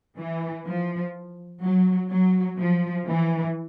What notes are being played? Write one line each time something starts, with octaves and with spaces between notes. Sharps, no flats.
E3
F3
F#3
F#3
F3
E3